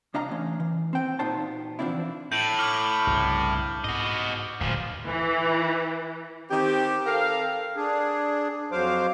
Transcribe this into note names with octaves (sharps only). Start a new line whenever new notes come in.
C2 D4 D#5 F5 A#5
E3 A3 C#4
E3
C4 G5
A#2 B3 D#4 F#4 C5 A5
E3 F3 C4 D4 E4
A2 G6 D7 F#7
D6 F6
C2 G2 C#3
G#2 F#4 D#5
D1 D2 A#2 F3 G#3
E3
D#3 C4 G4
C4 A4 A#4 F5
D4 G#4
F2 F#3 C5 F5 D6